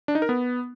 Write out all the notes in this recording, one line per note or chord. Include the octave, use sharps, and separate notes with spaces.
D4
D#4
A#4
B3